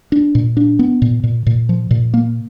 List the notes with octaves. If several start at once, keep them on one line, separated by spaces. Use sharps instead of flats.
D4
A#2
D4
B3
A#2
A#2
A#2
F3
A#2
A#3